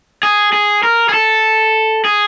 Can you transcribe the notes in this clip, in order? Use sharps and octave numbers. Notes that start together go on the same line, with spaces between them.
G#4
G#4
A#4
G#4
A4
G#4